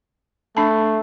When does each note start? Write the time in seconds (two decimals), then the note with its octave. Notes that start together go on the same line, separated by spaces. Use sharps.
0.57 A3 D4 A5